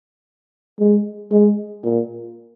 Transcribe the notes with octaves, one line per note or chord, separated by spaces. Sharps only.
G#3
G#3
A#2